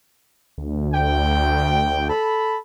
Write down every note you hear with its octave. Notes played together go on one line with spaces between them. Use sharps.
D2
G5
A4 B5